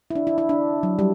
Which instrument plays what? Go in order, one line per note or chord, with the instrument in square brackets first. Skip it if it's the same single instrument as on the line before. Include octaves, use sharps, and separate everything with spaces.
[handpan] E4
D4
E4
E4
D4
F#3
G3